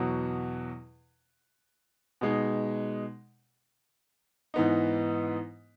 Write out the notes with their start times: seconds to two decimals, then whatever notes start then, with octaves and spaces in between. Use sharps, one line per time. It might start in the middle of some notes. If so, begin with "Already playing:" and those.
Already playing: E2 B2 F#3
2.21 B2 G#3 D#4
4.54 G#2 E3 B3 D#4